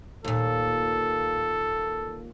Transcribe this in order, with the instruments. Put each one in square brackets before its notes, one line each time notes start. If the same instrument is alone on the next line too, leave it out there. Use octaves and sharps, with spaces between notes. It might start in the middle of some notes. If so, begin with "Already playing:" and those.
[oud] D#2 A#2 [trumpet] A4